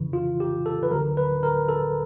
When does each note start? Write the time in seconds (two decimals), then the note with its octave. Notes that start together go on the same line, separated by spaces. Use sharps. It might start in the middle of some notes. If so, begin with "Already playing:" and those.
Already playing: F2 C#3 E3
0.13 F4
0.40 G4
0.66 A4
0.83 B4
0.91 D2 D3 F#3 A#4
1.17 B4
1.43 A#4
1.69 A4